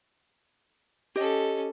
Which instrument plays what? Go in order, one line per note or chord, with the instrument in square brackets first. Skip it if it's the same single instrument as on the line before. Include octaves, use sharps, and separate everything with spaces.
[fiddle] C#4 A4 [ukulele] G4 D#5